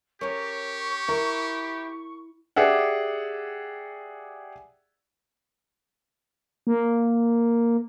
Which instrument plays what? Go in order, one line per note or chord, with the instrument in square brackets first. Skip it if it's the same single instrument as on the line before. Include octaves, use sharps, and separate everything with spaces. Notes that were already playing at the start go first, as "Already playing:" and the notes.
[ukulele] C#4 [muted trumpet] G4 [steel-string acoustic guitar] A#4 C#5 [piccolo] C#6
[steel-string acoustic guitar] E4 [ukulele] A#4
[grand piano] G4 G#4 D5 E5 F#5
[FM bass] A#3